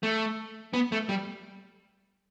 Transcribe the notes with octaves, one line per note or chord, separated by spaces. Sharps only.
A3
B3
A3
G3